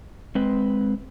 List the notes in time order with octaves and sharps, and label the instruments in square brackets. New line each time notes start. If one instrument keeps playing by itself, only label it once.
[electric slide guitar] G#3 C4 B4